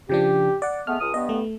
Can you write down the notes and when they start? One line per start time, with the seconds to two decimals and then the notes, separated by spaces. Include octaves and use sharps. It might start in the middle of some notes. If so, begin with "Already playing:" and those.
0.09 C#3 F3 D4 G4
0.62 D5 F#5
0.87 G#3 A3 B3 F6
1.00 C#2 D#6
1.14 G2 B3 D#5
1.29 A3